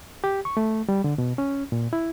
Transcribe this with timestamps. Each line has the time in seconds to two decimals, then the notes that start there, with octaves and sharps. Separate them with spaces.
0.24 G4
0.45 C#6
0.57 A3
0.89 G3
1.04 D3
1.18 B2
1.38 C#4
1.72 A#2
1.93 E4